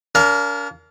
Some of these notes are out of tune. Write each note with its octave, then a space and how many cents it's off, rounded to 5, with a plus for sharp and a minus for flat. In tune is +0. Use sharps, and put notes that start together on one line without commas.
D4 -45 A#4 +0 F5 +0